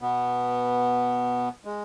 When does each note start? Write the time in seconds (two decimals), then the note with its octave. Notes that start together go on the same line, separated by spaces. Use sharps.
0.02 B2 B3
1.65 G#3